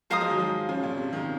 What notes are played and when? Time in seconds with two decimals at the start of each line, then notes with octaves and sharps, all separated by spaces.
0.10 F3 G#3 C5 F5 A#5 D#6
0.20 F3 G#3
0.30 D#3 F#3
0.39 F3 G#3
0.69 C#3 F3
0.83 A#2 C#3
0.97 C3
1.13 C3 D#3